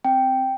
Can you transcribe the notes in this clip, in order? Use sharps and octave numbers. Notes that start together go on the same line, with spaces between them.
C4 G5